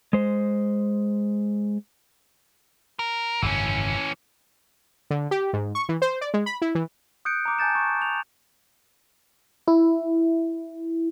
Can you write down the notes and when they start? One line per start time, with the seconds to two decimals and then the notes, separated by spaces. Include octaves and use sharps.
0.13 G#3 C5
2.99 A#4
3.42 G#1 F#2 C#3 E3 C#4
5.10 D3
5.31 G4
5.53 G#2
5.75 C#6
5.89 E3
6.02 C5
6.21 D5
6.34 G#3
6.46 B5
6.62 E4
6.75 E3
7.25 D#6 F#6 G6 C#7 D7
7.46 A#5 D6
7.59 G#5 A5 G6 A6 E7
7.75 C#6
8.02 F7
9.68 E4